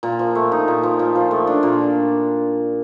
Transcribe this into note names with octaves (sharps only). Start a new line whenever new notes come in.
A#2
F3
A3
D#4
A#2
F3
A#2
F3
A3
D4
A#2